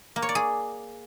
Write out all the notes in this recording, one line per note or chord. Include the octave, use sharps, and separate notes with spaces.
A#3
C#5
D5
G#4